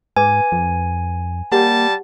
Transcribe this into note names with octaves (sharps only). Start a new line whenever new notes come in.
G#2 B4 G#5 D6
F2
G3 A#3 G4 C#5 F#5 A5